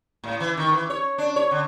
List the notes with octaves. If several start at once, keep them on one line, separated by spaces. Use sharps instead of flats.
A2
E3
D#3
E3
C#5
D4
C#5
D3